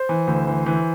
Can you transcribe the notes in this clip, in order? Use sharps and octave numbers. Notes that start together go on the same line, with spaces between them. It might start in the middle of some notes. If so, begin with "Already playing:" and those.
Already playing: C5
E3
D2
E3
E3